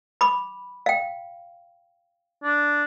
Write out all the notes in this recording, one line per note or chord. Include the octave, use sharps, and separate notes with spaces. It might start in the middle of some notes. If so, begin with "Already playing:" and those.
B5 D6
F5 G5
D4